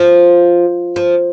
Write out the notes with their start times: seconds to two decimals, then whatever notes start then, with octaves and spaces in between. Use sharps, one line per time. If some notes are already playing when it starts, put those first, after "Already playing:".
Already playing: F3
0.96 F3